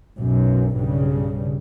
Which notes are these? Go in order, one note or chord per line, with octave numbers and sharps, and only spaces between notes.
B1 F#2
B1 G2 C#3 G3